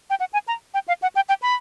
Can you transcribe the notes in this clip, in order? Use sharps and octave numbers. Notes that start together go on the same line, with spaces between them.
G5
F#5
G#5
A#5
G5
F5
F#5
G5
G5
B5